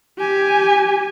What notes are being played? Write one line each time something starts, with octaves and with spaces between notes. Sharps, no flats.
G4 G#5